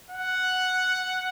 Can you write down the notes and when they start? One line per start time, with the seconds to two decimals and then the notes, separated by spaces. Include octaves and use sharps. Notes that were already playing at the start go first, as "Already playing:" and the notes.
0.11 F#5